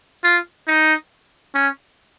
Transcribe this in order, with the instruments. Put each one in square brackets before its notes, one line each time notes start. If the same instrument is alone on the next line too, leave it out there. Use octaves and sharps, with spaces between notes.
[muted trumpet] F4
D#4
C#4